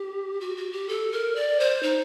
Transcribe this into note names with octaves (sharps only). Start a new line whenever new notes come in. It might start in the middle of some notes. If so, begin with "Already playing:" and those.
Already playing: G4
F#4
F#4
G4
A4
A#4
D5
C5
D#4